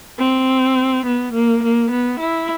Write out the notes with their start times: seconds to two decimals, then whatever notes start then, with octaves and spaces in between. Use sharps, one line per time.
0.19 C4
1.06 B3
1.33 A#3
1.63 A#3
1.91 B3
2.20 E4